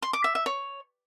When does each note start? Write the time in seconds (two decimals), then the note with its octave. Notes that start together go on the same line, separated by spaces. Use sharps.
0.02 C6
0.13 D6
0.24 E5
0.35 E5
0.46 C#5